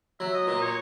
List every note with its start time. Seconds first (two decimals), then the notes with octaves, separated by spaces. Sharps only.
0.20 F#3 E5
0.34 D#5
0.47 A#2 D#5
0.61 C#5